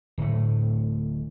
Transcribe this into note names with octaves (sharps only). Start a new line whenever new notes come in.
D1 A2 A3